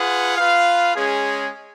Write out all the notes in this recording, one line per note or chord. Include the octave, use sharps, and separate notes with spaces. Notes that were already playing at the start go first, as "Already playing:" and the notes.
Already playing: F4 G#4 B4 F#5
F4 B4 F5
G#3 C#4 G#4